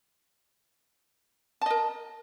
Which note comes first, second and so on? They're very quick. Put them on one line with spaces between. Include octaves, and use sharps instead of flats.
A5 D#5 A#4